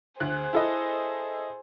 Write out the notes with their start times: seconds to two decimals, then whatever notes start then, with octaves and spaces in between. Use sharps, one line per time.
0.20 D2 G#4 C5 F#6
0.53 E4 A4 D#5